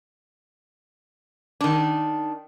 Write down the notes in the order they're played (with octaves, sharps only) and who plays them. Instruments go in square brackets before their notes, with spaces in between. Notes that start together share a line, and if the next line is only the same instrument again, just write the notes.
[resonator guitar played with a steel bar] D#3 D4